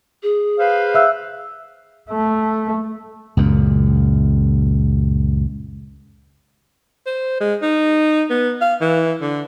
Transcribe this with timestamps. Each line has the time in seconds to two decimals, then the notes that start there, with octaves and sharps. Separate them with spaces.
0.23 G#4
0.59 B4 C5 F5
0.94 E5 E6 F#6
2.10 A3
3.37 C#2 F#2 A#2
7.06 C5
7.40 G#3
7.62 D#4
8.30 B3
8.61 F5
8.81 E3
9.21 D3